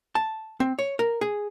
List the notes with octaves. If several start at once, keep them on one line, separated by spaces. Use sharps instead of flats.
A5
C4
C#5
A#4
G#4